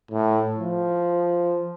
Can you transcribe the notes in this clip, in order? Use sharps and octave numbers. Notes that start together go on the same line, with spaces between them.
A2
F3